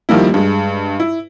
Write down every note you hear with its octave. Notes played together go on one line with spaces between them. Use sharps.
D#3 F3 G3 A#3 E4
G2 G#3
E4